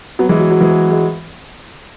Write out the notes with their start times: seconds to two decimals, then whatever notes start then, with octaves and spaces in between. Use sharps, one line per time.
0.19 F#3 B3
0.29 E3 G#3
0.40 F#3
0.51 F#3
0.61 E3 G#3
0.91 G#3